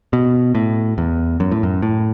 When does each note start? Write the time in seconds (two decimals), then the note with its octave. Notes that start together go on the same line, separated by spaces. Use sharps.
0.13 B2
0.55 A2
0.98 E2
1.40 F#2
1.51 A2
1.63 F#2
1.82 A2